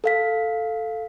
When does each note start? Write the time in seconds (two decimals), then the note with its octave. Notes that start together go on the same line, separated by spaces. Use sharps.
0.04 A4 F5 B6